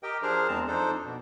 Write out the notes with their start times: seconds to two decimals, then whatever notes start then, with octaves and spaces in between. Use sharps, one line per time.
0.03 G4 A#4 D#5 G5
0.23 F3 D4 G#4 A#4 C5 F6
0.48 E2 G#3 C4 A5 A#5
0.68 F2 D4 D#4 A4 C5
1.04 B2